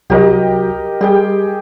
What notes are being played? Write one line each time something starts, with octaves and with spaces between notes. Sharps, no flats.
C2 F#3 F#4 G4 A#4 D#5
G3 G4 G#4 G5